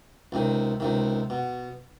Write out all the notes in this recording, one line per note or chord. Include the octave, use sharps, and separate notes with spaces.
C#2 C3 D#3
C#2 C3 D#3
B2